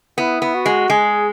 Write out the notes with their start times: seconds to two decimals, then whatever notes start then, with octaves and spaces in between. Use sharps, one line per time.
0.18 B3 E4
0.42 B3
0.54 F#4
0.66 G#3
0.90 G#3 G#4